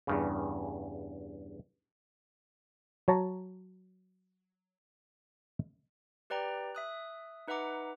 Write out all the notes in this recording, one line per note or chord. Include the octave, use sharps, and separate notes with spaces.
E2 G2 C#3
F#3 C#5 A5 A#5
G4 B4 D5 G5 A#5
E5 D#6 F#6
D#4 B4 E5 F#5 A#5 D6